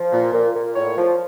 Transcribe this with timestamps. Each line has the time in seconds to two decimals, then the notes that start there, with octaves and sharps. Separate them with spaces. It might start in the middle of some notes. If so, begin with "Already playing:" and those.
Already playing: F3
0.11 A#2
0.33 A#2
0.54 A#2
0.75 A2 C#5
0.97 F3